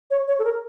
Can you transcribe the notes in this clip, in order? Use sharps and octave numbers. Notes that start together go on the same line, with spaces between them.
C#5
C#5
A4
A#4